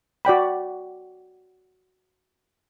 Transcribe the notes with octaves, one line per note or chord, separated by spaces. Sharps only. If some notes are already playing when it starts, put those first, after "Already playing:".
F#4 D5 G5 B5